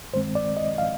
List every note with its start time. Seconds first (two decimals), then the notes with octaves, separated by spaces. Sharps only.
0.13 G2 D#3 G#3 C4 C5
0.35 D5
0.57 D#5
0.78 F5